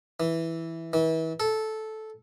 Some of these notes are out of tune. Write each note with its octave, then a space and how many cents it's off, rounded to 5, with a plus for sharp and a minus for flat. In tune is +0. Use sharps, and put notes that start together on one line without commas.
E3 -5
E3 -35
A4 -10